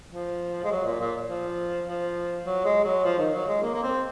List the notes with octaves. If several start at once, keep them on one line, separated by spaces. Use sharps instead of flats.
F3
G#3
F#3
A#2
A#2
F3
F3
F#3
G#3
F#3
F3
D#3
F#3
G#3
A#3
A#3
C4